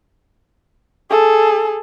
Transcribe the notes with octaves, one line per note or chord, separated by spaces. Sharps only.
G#4 A4